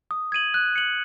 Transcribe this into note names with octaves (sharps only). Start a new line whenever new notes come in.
D#6
G#6 D#7 F#7
F#6
C#7 F#7